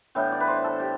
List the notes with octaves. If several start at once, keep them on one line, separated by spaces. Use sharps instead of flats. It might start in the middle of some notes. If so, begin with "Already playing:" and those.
A2 E3 B3 D4 G5
D5
B4
C5
A4
G4